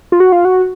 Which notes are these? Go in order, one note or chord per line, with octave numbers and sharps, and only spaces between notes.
F4
F#4
F4
F#4